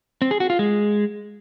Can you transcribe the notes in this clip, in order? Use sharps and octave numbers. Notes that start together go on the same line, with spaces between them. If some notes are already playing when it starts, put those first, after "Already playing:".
C4
G#4
F#4
F4
G#3